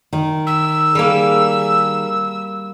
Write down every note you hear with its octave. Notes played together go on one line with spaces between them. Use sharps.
D#3 D#4
E6
G3 A#3 G#4